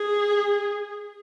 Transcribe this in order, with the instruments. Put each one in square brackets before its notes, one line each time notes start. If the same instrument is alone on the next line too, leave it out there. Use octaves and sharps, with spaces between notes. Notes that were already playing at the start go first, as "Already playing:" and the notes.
Already playing: [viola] G#4